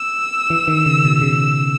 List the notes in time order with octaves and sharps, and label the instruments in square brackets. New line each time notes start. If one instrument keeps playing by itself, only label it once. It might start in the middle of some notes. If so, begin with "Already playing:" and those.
Already playing: [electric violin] E6
[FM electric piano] E3
D#3
C#3
B2
C#3